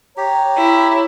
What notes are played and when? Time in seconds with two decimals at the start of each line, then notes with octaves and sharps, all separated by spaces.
0.17 G4 C#5 A#5
0.57 E4